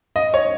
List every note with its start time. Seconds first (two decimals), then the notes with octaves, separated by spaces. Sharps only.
0.16 D#5
0.34 C#5